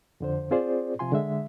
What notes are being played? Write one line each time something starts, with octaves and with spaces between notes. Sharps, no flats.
F2 D3 C5
C4 F4 G#4 C5 D5
C3 F3 F4 G#5 C6
D3 G#3 E5